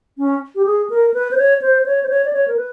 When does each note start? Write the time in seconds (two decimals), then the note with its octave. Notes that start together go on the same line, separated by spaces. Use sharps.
0.18 C#4
0.55 G4
0.66 G#4
0.90 A#4
1.14 B4
1.31 C5
1.37 C#5
1.62 C5
1.86 C#5
2.03 C5
2.09 C#5
2.25 D5
2.33 C#5
2.48 A#4
2.57 B4